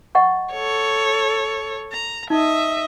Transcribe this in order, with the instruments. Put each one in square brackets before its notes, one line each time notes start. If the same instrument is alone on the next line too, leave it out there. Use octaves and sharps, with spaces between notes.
[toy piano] D#5 F#5 C#6
[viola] A4 C#5
A#5
[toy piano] D#4 [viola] D#5 E5